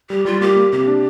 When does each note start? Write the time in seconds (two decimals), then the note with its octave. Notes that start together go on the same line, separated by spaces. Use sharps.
0.10 G3 G4
0.25 G3 F4
0.41 A#3 G4
0.56 A#3
0.72 C3 G4
0.88 D4